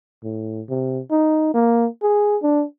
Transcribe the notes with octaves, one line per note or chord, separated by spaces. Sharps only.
A2
C3
D#4
A#3
G#4
D4